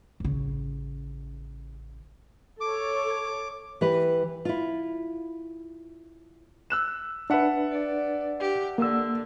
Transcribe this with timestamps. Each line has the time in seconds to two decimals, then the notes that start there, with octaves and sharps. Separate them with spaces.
0.20 A1 C#3
2.61 A4 C#5 D6
3.81 E3 G4 B4
4.45 E4 F4
6.70 E6 F#6 E7
7.30 D4 B4 E5 F#5 A5
7.72 D5
8.40 G4
8.78 D3 A#3 E6